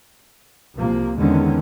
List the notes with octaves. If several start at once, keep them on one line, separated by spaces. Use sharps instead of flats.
C2 C3 F3 A#3
E2 D3 D#3 G#3 C#4